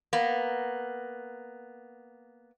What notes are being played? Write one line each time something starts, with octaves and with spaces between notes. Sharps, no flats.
A#3 B3